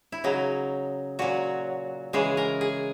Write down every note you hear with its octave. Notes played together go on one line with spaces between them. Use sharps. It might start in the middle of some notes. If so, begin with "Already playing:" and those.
E4
C#3 F#3 D#4
A#2 F#3 F#4
C#3 E3 G#3 G#4
A#4
G#4